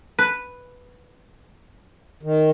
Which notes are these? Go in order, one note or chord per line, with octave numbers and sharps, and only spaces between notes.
B4
D#3